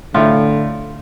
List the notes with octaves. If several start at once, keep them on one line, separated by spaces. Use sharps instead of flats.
A2 D3 F4